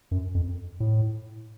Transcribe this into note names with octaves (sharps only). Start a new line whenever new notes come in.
F#2
F2
A2